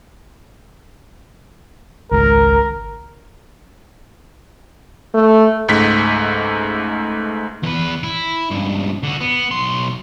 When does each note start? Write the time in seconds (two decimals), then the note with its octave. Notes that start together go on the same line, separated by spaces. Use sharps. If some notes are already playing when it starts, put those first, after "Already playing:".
2.12 G#1 C#2 A#4
5.14 A3
5.68 C#2 G#2 A3 B6
7.63 E2 B4
8.03 E4
8.51 C#2 G2
9.03 D3 F#4
9.21 B3
9.51 B1 C6